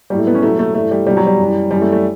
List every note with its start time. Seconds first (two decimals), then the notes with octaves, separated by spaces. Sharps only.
0.10 A2 F#3 G3
0.19 A3
0.27 B3
0.35 C#4
0.42 E2 B2 F#3 A3
0.59 A3
0.75 G2 E3 A3
0.91 G3
1.06 E2 B2 F#3 G3
1.17 F#3
1.27 G3
1.38 F#2 E3
1.71 F#2 E3 G3
1.81 A3
1.92 A3